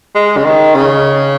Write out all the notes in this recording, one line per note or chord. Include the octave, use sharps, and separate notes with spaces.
G#3
C#3
D#3
C#3